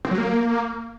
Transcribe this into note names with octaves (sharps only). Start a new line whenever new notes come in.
C4
F#3
A#3